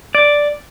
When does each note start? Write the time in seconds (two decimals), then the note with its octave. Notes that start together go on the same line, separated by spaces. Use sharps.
0.15 D5